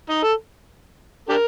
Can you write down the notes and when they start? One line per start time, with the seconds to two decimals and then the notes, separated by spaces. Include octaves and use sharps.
0.10 D#4
0.23 A4
1.29 D4 G4 A#4